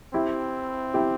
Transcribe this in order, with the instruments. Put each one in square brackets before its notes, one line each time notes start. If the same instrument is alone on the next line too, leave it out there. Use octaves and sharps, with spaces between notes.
[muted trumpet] C4 [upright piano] E4 G4
[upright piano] E4 G4